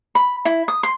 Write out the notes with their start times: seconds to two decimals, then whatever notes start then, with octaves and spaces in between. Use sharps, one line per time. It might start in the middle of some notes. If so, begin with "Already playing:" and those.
0.15 B5
0.45 E4
0.68 D#6
0.83 C6